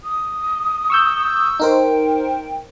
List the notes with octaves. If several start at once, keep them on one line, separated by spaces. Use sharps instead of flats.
D#6
C#6 E6 G6
D#4 A#4 C5 G5